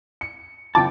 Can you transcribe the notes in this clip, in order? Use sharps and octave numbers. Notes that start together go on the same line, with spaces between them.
C#7
F#1 F4 G5 A5 D6